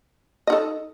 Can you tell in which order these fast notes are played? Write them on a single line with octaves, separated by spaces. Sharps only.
D#5 D#4 A4